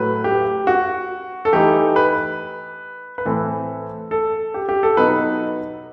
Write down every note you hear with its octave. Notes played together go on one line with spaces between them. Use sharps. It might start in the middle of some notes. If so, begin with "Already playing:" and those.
Already playing: A2 F#3 A3 B4
G4
F#4
A4
E3 A3 D#4 G4
B4
B4
A2 E3 A3 C4 A4
A4
G4
G4
A4
B2 F#3 B3 D#4 B4